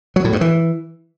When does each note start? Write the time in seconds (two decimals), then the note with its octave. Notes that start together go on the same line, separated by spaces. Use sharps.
0.16 F#3
0.24 A2
0.33 G2
0.41 E3